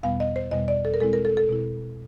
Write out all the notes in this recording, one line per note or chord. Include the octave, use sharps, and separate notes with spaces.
E2 B2 G3 B3 F5
D#5
C5
E2 B2 G3 B3 D#5
D5
A4
A#4
B2 G#3 C4 E4 A4
A#4
A4
A4
B2 G#3 C4 E4